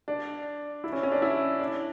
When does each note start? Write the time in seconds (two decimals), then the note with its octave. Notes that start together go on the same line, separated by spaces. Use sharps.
0.08 D4
0.84 E4
0.92 C#4
1.03 C#4
1.12 D4
1.22 E4
1.59 D4